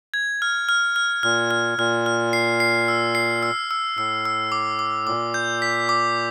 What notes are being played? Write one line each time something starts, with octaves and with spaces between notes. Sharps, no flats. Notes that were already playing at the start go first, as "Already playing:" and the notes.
G#6
F6
F6
F6
A#2 F6
F6
A#2 F6
F6
C7
C7
E6
C7
E6
E6
A2 E6
E6
D6
D6
A#2 D6
G6
B6
D6